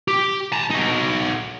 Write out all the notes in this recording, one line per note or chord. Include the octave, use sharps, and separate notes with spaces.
G4
A5 A#5
D#4 F#4